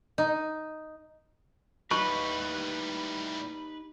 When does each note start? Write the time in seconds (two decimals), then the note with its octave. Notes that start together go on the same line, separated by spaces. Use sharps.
0.18 D#4
1.91 A2 G3 D#4 G4 B4 D#5 C#6